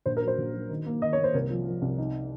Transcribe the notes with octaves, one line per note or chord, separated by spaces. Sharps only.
A#1 C5
A#4
F#3
C5
A#1
F#3
D#3
A#3
D#3 D#5
C#5
A#3
C5
C2 A#4
F3
F3
C2
D#4